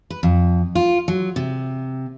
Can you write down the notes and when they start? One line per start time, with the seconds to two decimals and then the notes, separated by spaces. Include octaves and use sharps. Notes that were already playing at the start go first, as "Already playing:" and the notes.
0.10 B4
0.23 F2
0.75 F4
1.08 F#3
1.36 C3